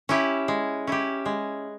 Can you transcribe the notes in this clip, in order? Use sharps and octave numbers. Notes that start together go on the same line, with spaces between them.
C#4 E4 G4
G#3
C#4 E4 G4
G#3